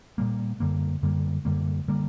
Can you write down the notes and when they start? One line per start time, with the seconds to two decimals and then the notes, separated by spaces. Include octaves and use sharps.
0.18 A#2 G3 A#3
0.60 F#2 D3 G3 A#3
1.03 F#2 D3 G3 A#3
1.45 F#2 D3 G3 A#3
1.88 D3 G3 A#3